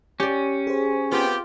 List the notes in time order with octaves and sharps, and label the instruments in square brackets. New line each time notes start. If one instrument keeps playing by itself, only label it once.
[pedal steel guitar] C#4 [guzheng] G4 D5
[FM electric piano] G#4 C5
[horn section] B3 C4 G4 [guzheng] F4